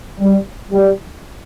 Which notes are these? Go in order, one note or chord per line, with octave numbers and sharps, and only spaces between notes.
G3
G3